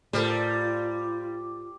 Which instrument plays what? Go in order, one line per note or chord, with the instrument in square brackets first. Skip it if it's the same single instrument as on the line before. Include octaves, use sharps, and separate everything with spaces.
[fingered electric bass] A2 [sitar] G3 [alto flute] F4 [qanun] A4 A#4 C5